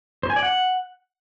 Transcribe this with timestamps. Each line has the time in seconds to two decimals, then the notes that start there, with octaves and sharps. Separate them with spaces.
0.23 C5
0.30 G#5
0.36 D5
0.43 F#5